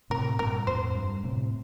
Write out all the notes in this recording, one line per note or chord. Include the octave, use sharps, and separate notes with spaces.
A2 C3 A#4
G2 A#2 A#4
F2 A2 C5
G2
A2 C3